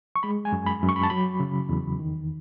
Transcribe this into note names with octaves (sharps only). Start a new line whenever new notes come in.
C#6
G#3 B5
G#5
F#2
B5
F#2
C#6
B5
A5
F#3 B5
C#3
E2
D#3